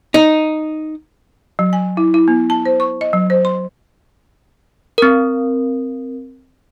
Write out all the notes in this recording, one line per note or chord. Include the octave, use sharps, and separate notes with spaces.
D#4
F#3
G#5
E4
E4
B3
A5
C5
C#6
D#5
F#3
C5
C6
C4 A#4